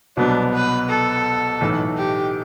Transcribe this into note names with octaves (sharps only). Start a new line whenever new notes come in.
C2 B2 F#3 B3 D4
B4
A4
B1 A2 E3 A3
G4